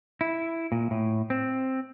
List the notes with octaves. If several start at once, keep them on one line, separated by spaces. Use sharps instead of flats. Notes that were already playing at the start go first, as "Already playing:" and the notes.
E4
A#2
A2
C4